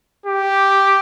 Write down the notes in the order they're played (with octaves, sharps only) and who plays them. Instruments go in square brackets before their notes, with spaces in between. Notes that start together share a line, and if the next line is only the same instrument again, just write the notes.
[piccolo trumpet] G4